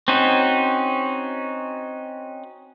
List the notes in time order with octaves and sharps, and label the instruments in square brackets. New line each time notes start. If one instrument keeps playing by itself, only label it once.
[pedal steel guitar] C4 C#4 D#4 F#4